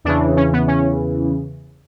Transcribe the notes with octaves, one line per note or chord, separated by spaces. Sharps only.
E2 C#3 E3 D4
C#4
B3
C#4